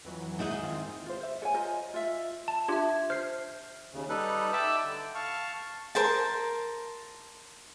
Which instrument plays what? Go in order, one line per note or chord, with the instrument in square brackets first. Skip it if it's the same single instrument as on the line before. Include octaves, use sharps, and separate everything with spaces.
[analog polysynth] F2 E3 F#3
[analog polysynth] D#2 F#5 G6 [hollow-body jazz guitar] G#2 E4 G#4
[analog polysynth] D#3 C4 F4
[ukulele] F4 C5
C5 E5
A4 C#5 G#5
F4 C5 D#5 A#5
F4 E5
[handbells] A5
[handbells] D4 F4 G4 [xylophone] E5 G#6
[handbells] C5 C7 [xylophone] F6
[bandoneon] D#2 C#3
G3 D#4 A4 B4 F#6
E5 G5 A5 B5 D6 E6
D3
F5 A5 C#6
[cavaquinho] A#4 C5 A5